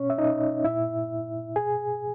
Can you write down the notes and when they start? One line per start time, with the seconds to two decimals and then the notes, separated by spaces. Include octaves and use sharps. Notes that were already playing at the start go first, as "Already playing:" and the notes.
Already playing: B2 C#4 C#5
0.10 E5
0.18 D#4 D#5
0.64 A#2 E4 E5
1.55 B2 G#4 G#5